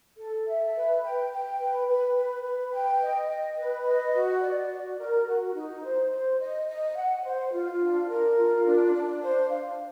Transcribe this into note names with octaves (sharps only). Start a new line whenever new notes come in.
A4
E5
B4
G5
G5
B4
B4
B4
B4
G5
D#5
D#5
B4
D#5
F#4
D5
F#4
A#4
F#4
D#4
C5
C5
D#5
D#5
F#5
C5
F4
D4
A#4
F4
D4
D4
C5
F5